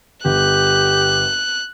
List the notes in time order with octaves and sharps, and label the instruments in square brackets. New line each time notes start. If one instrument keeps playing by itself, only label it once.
[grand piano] G1 [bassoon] G4 [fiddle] F#6